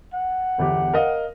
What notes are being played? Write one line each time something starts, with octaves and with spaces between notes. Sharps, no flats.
F#5
G1 E2 G4
A#4 D#5 F5